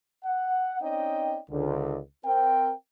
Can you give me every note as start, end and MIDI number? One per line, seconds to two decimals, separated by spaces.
0.24 0.79 78
0.81 1.38 60
0.81 1.38 61
0.81 1.38 63
0.81 1.38 74
0.81 1.38 75
0.81 1.38 79
1.50 1.99 37
1.50 1.99 50
2.25 2.73 60
2.25 2.73 70
2.25 2.73 79